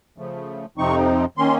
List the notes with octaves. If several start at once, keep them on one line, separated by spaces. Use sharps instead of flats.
C#3 F3 A3
F2 C3 F3 C4 D#4 C#6
D#3 A#3 C#4 C6